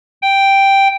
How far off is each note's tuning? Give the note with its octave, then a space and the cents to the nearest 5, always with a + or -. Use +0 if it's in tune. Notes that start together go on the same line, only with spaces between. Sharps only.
G5 +0